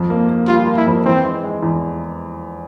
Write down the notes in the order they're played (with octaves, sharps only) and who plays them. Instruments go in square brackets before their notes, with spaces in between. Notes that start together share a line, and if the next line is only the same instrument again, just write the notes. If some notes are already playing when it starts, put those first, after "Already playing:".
Already playing: [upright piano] F2
A#3
A#3
[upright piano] G3 [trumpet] F4
[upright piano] A#3
[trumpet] E4
[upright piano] F2
[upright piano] E3 [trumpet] C4
[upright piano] G#3
G#3
E2